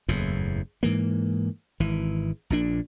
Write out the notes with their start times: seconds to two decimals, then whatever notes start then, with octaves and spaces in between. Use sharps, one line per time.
0.08 F#1 E2 A2
0.83 G#2 E3 A#3
1.80 G#1 E3
2.50 A#1 A#2 D4